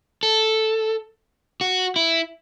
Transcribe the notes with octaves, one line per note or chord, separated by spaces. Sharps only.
A4
F#4
E4